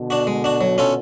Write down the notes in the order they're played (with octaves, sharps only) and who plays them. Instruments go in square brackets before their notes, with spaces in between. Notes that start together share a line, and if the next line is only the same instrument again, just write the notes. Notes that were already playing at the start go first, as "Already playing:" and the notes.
Already playing: [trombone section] B2 D3
[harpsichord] D4 F#4
G#3
D4 F#4
F#3
C#4 F4 A4